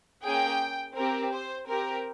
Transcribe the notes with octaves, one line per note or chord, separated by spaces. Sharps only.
A#3 C#4 G#4 G5
C4 G4 A#4
C5
C4 G4 A#4